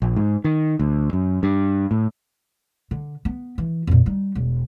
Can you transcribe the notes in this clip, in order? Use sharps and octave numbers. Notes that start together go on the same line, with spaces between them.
A#1
G#2
D#3
D2
F#2
G2
A2
D3
B3
E3
F2 A#2
G3 D#4
E1